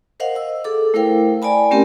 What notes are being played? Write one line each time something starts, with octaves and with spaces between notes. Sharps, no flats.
A#4 C5 D#5 F5 F#5
D#5 E6
G#4 A4 D6
A3 E4 A#4 C5 F5 G5
D5 G#5 A5 B5
A3 C4 C#4 G4 A#4 A5